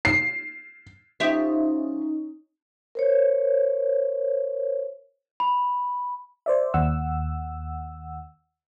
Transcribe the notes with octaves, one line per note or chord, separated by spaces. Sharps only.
C7
F3 C#4 D#4 G4 E5
A#4 C5 C#5
B5
C5 D5 E5
D#2 F#5 E6